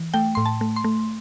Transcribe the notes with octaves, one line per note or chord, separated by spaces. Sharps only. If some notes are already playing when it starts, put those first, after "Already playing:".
Already playing: E3
A3 G5
A2 C6
A5
A3
C6
A3